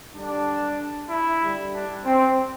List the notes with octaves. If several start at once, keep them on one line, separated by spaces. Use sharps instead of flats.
D3 G3 D4
E4
D3 G3
D4
C4